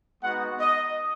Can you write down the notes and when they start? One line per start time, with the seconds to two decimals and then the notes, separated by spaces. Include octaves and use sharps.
0.22 G#3 B3 D#4 F#4 F#5
0.59 D#5